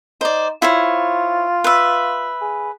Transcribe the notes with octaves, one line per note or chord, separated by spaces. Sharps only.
D#4 C5 D5
E4 F4 C5 C#5
B4 E5
G#4